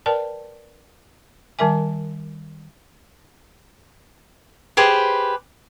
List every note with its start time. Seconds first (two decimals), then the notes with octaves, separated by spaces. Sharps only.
0.06 A#4 B4 D5 G5 A5
1.59 D#3 G3 A#4 E5 G#5
4.77 G4 G#4 B4 C5